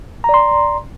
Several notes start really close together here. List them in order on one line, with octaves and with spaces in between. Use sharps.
A#5 D5 C6